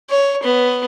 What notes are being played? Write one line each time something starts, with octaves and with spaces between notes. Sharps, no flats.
C#5
B3